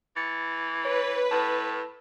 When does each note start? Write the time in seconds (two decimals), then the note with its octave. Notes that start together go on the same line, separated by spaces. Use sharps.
0.16 E3 A6 C#7
0.85 B4 C#5
1.31 A2 A5